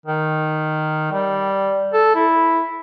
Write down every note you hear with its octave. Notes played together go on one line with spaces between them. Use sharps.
D#3
G3
A4
E4